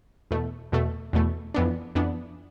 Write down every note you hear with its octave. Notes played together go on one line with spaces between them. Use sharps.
E2 B2 A3
E2 B2 A3
E2 B2 A3
F2 E3 B3 D4
F2 E3 B3 D4